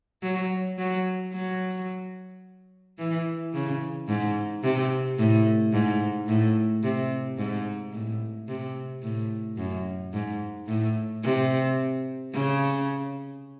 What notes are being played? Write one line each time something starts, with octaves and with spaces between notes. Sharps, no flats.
F#3
F#3
F#3
E3
C#3
G#2
C3
A2
G#2
A2
C3
G#2
A2
C3
A2
F#2
G#2
A2
C3
C#3